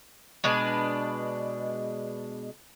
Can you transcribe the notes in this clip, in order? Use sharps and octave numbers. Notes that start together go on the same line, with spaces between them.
B2 G#3 D4 B4